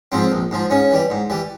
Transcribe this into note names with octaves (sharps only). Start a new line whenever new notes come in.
G#2 F3 C4
A#1
G#2 F3
G#2 C#4
E3 G3
G#2
E3 G3